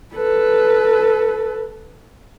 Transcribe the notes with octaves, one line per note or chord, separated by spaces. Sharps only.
A4 B4